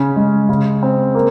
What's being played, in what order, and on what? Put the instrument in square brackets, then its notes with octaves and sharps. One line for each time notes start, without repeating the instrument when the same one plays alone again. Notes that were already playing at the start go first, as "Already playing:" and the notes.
Already playing: [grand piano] C#3 C#4
G#3
C#3
C4
A#3